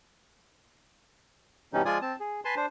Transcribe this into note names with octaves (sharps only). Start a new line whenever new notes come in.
G2 B2 E3 G3 C#4 D#4
F3 G#3 F4 D5 G#5 D#6
C4 A5
G#4
B4 G#5 A5 C6
D4 C5